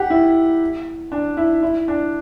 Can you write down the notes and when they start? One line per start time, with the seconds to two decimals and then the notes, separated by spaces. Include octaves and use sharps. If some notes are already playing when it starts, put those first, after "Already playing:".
Already playing: G4 F#5
0.10 E4
1.12 D4
1.37 E4
1.63 E4
1.88 D4